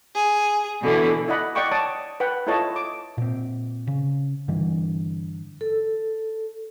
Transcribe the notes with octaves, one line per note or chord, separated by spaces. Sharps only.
G#4
B2 D3 E3
E4 D5 D#5 F#5 B5
D5 D#5 F#5 G5 C#6 D6
C#5 D5 A5 D6 D#6
B4 F#5 G5 B5
E4 F4 A4 C#5 D#5 A5
D6
A#2 C4
C#3
G2 D3 E3
A4